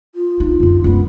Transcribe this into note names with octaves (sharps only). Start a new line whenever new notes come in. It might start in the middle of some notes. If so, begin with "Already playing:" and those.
F4
D#4
F#2 D3 F4
F#2 G#3 B3